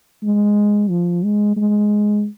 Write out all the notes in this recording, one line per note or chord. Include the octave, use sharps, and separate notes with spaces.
G#3
F3
G#3
G#3